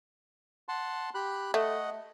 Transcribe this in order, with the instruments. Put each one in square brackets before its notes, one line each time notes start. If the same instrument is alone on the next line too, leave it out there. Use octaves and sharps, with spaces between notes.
[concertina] F#5 A5 C6
G4 B5 F#6
[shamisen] A3 [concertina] D#5 F#5